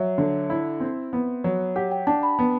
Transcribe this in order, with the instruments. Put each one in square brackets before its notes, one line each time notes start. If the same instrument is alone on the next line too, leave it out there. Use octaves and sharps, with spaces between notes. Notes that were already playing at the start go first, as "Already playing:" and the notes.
Already playing: [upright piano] F#3 [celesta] E5
[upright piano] D3
E4
C4
B3
F#3
[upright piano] G4 [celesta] F#5
[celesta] G5
[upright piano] D4 [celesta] A5
[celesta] B5
[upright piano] B3